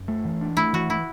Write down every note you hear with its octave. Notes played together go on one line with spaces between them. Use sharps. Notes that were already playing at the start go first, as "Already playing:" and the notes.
Already playing: F#2
A3
E3
D4
A3 E4
E3 F#4
E3 E4